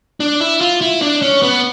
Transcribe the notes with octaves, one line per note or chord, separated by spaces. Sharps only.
D4
E4
F4
E4
D4
C#4
B3